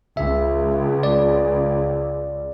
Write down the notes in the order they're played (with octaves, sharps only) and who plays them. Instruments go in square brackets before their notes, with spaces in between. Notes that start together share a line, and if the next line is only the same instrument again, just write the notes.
[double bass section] C#2 [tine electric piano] E5
[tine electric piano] D5